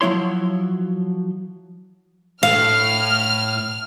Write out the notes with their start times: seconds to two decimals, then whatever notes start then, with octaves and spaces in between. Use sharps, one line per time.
0.01 F3 F#3 E4 C#5 C6
2.43 A2 A3 F5 F6